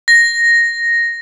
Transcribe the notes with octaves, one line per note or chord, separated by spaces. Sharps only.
A#6